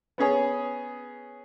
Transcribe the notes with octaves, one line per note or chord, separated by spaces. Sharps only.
B3 C#4 G#4 C#5